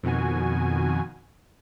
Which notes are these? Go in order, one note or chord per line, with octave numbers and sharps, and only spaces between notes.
F2 B2 D#3 F#4 G#5